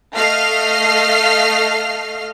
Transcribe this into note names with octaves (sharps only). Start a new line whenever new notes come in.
A3 D#5 F5 F6 C7